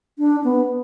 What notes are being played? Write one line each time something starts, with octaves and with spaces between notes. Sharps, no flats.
D4
B3